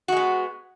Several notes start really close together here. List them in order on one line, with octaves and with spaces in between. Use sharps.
F#4 G#3 B3